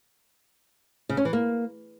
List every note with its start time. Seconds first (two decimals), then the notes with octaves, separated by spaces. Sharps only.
1.09 C#3
1.17 C#4
1.25 E3
1.33 A#3